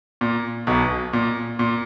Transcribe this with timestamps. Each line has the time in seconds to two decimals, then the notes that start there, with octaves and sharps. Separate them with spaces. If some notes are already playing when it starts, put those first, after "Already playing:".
0.21 A#2
0.67 B1 B2
1.13 A#2
1.59 A#2